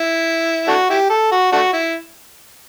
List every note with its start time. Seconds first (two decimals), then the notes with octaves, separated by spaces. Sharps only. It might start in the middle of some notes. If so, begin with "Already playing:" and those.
Already playing: E4
0.68 A3 D4 F#4
0.90 E4 G4
1.10 A4
1.32 F#4
1.52 A3 D4 F#4
1.73 E4